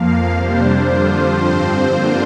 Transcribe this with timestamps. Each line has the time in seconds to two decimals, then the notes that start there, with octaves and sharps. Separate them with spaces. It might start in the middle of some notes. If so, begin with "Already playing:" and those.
Already playing: F2 F3 A#3 F5
0.35 C3 G3 D4 C5
0.85 F2 D3 F3 D4 F4
1.37 G2 F3 C4 C5
1.88 G2 D3 A#3 D4 F4